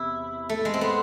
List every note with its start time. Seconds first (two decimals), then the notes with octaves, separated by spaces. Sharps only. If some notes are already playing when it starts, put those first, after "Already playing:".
Already playing: E2 C3 E4
0.49 A3
0.65 G#3
0.74 C4
0.81 B3